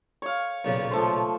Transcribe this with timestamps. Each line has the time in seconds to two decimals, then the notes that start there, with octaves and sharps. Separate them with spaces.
0.22 C#5 F5
0.65 B1 A#2 C#3
0.91 F3 A3 C5